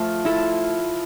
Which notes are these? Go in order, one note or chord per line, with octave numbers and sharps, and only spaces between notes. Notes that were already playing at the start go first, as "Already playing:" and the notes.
Already playing: F3 A3 F4
E4 A4